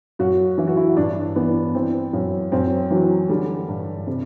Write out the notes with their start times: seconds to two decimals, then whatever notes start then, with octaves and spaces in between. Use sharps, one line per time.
0.19 F#2 F#4
0.58 E3 E4
0.67 F#4
0.77 E4
0.97 G2 D4
1.36 E3 B3
1.75 E3 C4
2.13 F#2
2.52 F#2 C4
2.90 E3 F#3
3.29 D3 G3
3.68 G2
4.07 C3